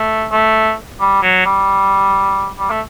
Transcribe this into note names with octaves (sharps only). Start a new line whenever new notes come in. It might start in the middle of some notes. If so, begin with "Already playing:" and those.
Already playing: A3
A3
G3
F#3
G3
G3
A3